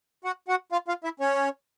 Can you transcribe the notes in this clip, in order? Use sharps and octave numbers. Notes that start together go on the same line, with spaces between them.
F#4 F#5
F#4 F#5
F4 F5
F4 F5
E4 E5
C#4 C#5